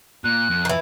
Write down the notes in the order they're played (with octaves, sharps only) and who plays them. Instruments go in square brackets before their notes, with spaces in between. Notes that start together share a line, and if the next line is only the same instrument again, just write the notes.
[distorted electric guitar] A#2 [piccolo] F#6
[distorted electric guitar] F2
[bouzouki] D#3 E3